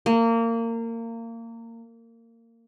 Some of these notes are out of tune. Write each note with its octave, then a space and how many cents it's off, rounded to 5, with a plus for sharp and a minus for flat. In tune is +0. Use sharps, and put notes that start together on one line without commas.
A#3 -25